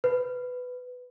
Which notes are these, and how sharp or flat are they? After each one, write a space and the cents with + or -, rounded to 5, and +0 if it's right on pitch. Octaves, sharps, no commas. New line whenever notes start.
B4 +10